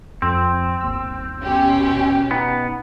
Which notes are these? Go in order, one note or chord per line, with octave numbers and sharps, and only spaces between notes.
F2 C4
G1 D#2 E6
B2 C#4 G4
B3 D#4